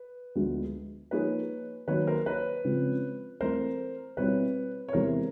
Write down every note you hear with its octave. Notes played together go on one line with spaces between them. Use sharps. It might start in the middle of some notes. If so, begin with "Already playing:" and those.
Already playing: B4
D2 D3 F3 G#3 B3
F3 A#3 D#4 G#4 B4 C#5
D#3 F#3 A#3 B4 C#5
A#4 C5
B4 C#5
C#3 F3 G#3 C4 F4
E3 A3 C4 A#4 C5
B2 G3 C4 E4 B4 C#5
C#5
E2 C3 E3 G#3 A#4 C5